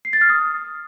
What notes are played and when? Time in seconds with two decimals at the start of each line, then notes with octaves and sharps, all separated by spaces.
0.05 C7
0.13 A6
0.21 F6
0.30 D#6